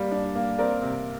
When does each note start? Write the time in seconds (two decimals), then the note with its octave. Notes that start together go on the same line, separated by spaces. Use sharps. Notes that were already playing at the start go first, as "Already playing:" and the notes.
Already playing: G3 A#3
0.11 D4
0.35 A#3
0.58 C4 A#4 D5
0.82 C3